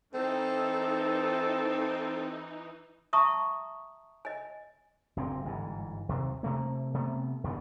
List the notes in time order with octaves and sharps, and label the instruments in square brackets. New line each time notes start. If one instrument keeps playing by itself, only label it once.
[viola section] E3 D#4 [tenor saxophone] C4 [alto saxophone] A4
[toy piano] E5 A5 A#5 C#6 D#6
D#5 G#5
[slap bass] F#1 A#2 C4
G1 G#2 E3
D#2 C3
C3 A3 A#3
C3 A3 B3
D#2 D3 F3 B3